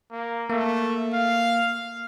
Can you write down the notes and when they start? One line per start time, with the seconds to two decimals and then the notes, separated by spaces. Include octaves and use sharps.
0.11 A#3
0.50 A3 A#3
1.14 F5